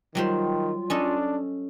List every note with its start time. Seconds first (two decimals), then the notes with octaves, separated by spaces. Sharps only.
0.15 D#3 F#3 G3 F4 C5
0.90 C#4 D4 A4 D#5